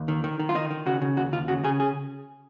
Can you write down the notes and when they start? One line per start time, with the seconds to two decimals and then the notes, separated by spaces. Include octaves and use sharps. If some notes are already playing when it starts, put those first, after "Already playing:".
Already playing: D#2
0.08 D#3
0.24 D#3
0.39 D#3
0.49 F4
0.55 D#3 D#4
0.71 D#3
0.86 C#3 F#4
1.02 C#3
1.17 D#2 F#4
1.32 D#2 F4
1.48 C#3 F#4
1.64 C#3 G#4
1.80 G#4